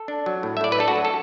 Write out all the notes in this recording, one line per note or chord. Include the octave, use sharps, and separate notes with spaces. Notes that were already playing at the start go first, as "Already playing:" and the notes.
Already playing: A4
D4
F#3
A2
E5
A2 D5
B4
D4 A4
F#4
F#3
A4